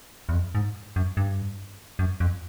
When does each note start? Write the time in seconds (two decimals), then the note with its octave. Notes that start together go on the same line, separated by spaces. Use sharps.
0.29 E2
0.33 F2
0.55 G#2
0.96 F#2
1.17 G2
1.99 F#2
2.20 F2